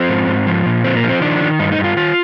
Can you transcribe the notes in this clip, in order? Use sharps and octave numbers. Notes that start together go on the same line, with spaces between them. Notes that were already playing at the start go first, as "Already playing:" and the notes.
Already playing: F3 C4
G#2
G#2
F3
A#2
F3 C4
A#3
F3
C4
D#3 D4
D#3
G2 D#4
D#4
G2
F4
D#3 F4